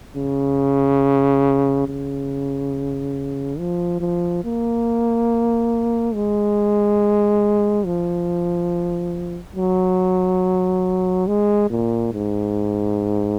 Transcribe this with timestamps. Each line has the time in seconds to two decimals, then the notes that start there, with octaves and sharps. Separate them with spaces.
0.16 C#3
1.88 C#3
3.59 F3
4.00 F3
4.44 A#3
6.14 G#3
7.85 F3
9.56 F#3
11.27 G#3
11.70 A#2
12.13 G#2